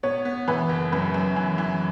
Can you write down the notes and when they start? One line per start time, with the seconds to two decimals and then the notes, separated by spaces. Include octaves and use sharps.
0.03 B3 C#5
0.25 B3
0.48 E3 B4
0.69 F#1
0.92 F#2 B4
1.14 F#2
1.36 E3
1.58 E3